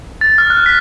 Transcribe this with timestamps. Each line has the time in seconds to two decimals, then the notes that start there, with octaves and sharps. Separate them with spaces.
0.21 A6
0.38 F6
0.50 F#6
0.66 B6